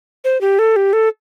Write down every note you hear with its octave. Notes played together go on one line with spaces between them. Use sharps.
C5
G4
A4
G4
A4